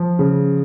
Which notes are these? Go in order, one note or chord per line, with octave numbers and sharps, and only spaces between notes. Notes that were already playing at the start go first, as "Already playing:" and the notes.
Already playing: F3
C#3